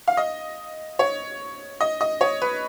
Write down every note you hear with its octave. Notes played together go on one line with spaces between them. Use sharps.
F5
D#5
C#5
D#5
D#5
C#5
B4